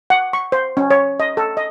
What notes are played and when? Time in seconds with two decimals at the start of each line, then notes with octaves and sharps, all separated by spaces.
0.10 F#5
0.33 C#6
0.52 C5
0.77 C#4
0.91 C#5
1.20 D#5
1.37 A4
1.57 D#5